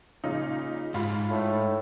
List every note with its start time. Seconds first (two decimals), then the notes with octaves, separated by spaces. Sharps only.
0.24 A#2 C#3 D#4
0.94 G#2 F4 B5
1.30 A2